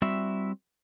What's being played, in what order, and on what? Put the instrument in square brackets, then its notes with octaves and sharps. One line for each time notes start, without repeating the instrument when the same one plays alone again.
[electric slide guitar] G3 C4 E4 F#4 E5